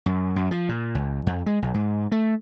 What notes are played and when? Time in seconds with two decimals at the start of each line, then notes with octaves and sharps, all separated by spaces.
0.06 F#2
0.36 F#2
0.51 F3
0.69 A#2
0.95 C#2
1.27 F2
1.46 G#3
1.62 B1
1.74 G#2
2.12 A3